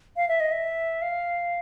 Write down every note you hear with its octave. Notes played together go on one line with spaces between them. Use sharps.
F5
E5
D#5
E5
F5